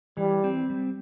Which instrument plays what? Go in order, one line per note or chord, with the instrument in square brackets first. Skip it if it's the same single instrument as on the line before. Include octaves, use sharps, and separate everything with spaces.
[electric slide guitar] E3 [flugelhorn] G3
[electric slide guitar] C4
G3